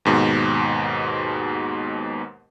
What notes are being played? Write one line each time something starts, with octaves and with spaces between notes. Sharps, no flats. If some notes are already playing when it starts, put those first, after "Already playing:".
D#2 G#2 B2